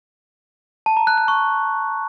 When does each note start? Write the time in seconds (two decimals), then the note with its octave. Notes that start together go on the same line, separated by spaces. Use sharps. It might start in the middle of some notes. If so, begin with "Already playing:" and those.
0.86 A5
0.97 A#5
1.07 F#6
1.18 F#6
1.28 C#6